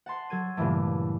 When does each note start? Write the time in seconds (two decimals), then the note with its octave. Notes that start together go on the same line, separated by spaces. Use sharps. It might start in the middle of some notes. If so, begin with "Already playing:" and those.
0.06 F#5 A5 C6 C7
0.30 F#3 A4 G#6 D#7
0.57 G2 A#2 C#3 E3 A3